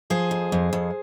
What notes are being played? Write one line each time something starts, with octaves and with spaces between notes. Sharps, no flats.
F3 G#4 C5
F2
F2
F2